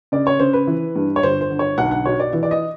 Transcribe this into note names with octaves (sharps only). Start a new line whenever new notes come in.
C#3 D5
C#5
C#3 C5
B4
E3
G2
C#5
G1 C5
C5
D3
C#5
B1 F#5
F#5
B2 C#5
D5
E3
D5
D#5